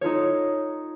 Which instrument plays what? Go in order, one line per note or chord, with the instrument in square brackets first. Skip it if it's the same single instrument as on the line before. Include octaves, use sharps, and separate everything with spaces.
[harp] D#4 F4 A4 C#5